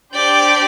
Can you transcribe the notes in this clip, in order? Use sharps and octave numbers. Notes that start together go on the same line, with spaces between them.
D4 G4 C5 D5 G5